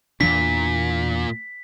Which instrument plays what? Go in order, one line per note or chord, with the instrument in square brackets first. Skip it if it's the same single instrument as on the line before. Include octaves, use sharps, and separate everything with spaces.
[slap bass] E2 E3 D4 [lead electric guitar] A#2 [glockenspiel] B6